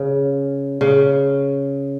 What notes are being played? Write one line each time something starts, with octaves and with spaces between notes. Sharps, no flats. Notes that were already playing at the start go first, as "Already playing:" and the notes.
Already playing: C#3
C#3